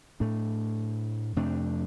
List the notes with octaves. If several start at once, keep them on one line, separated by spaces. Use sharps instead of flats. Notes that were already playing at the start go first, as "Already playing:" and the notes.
A2 A3 D4
F2 C3 A3 D4